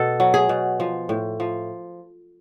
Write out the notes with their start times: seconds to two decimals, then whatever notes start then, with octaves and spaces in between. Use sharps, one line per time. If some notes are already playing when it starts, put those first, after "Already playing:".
Already playing: B2 A4
0.20 F#3
0.34 G#4
0.49 B2
0.80 F3
1.09 A2
1.40 F3